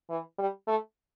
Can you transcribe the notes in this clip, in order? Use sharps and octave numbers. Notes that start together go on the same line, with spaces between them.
E3
G3
A3